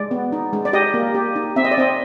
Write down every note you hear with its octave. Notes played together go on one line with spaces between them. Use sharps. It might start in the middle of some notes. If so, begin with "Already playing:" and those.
Already playing: G#3 D5
B3
D#4
G#3
D5
G4 D#5
A#3
G4
D#4
C4 E5
D#5
D5
C4 D#5